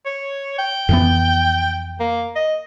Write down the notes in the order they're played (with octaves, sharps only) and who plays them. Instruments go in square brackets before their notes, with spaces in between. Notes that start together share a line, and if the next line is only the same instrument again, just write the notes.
[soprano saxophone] C#5
G5
[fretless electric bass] F2 E3 B3
[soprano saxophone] A#3
D#5